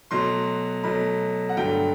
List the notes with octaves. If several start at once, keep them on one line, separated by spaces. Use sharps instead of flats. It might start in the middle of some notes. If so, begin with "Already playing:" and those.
B2 F#3 A3 C6
B2 F#3 A3 B5
F#5
G2 D3 F#3 A3 G5